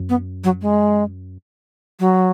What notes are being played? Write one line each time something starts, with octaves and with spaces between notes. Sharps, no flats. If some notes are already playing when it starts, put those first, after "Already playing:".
Already playing: F#2
B3
F#3
G#3
F#3